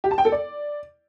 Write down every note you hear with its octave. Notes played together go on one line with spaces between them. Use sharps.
G4
A5
G5
A4
D5